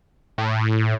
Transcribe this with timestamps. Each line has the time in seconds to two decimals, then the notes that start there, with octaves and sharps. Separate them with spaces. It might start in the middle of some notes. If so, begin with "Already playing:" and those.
0.38 A2